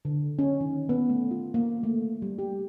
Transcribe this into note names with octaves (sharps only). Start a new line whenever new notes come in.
D3
C#4
D#3
B3
A3
F4
A#3
A3
G3
G4